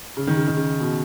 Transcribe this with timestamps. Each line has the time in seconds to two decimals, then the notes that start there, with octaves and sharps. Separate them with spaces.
0.17 C#3
0.27 D#3
0.37 C#3
0.48 D#3
0.57 C#3
0.80 B2